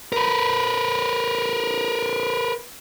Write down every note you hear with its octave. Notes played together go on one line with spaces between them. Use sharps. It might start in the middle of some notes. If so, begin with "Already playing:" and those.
A#4 B4